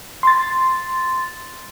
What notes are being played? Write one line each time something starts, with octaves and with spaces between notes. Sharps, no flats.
C6 A6